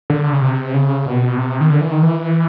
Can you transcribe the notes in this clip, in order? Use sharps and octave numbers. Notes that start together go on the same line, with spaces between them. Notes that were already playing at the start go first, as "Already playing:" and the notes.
D3
C#3
C3
C#3
B2
C3
D#3
D3
E3
D#3
E3